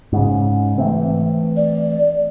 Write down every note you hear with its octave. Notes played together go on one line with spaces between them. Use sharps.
G#2 C#3
E3 A3 C4
D5